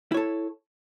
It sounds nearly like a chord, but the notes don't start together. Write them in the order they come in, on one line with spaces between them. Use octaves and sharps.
E4 C#5 A4